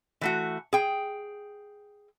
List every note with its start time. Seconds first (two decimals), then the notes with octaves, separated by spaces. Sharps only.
0.21 E3 A3 F#4
0.73 G#4 G5